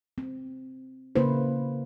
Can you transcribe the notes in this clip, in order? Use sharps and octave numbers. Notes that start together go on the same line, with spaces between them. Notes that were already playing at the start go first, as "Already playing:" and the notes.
C4
C#3 A#3 E4 B4 C5